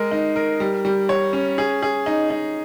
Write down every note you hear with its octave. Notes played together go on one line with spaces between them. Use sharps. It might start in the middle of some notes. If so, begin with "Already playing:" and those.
Already playing: G#3 A#4
D#4
A#4
G3
G3
C#5
C#4
G#4
G#4
D#4
D#4